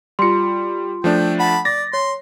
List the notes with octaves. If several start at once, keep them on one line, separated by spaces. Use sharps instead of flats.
G3 F4 C6 C#7
F3 A3 D4 G5
F#5 A5 B5
D5 A6 A#6
C#5 C6